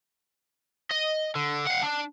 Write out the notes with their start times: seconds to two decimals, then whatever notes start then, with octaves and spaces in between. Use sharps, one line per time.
0.91 D#5
1.35 D3
1.67 F5 F#5
1.82 D4